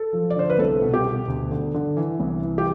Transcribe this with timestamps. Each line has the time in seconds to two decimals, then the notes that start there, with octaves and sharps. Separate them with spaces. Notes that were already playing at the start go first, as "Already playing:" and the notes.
Already playing: A4
0.13 F3
0.30 D5
0.36 D3 C5
0.50 B4
0.59 C2 A4
0.82 B2
0.94 G4
1.04 B2
1.28 D2
1.51 D3
1.74 D3
1.97 E3
2.20 C2
2.43 E3
2.58 G4